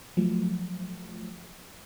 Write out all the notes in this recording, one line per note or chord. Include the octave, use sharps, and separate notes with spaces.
F3 F#3 A3